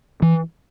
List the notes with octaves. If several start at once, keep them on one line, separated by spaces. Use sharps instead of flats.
E3